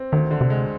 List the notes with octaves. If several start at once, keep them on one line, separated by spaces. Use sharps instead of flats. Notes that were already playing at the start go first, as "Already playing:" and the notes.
Already playing: C4
D2 D#3
D3
C3
G#3